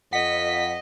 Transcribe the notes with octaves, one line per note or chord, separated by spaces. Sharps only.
F2 D#5 F#5 B6